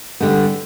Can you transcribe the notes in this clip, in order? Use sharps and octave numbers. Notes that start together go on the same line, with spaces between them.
D3 G3 B3